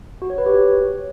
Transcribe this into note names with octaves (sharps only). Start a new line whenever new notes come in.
F#4
C#5
B4
G4
C#5